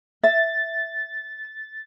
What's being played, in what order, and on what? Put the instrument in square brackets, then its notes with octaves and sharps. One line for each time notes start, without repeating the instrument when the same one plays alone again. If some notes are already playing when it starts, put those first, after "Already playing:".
[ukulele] E5 [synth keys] A6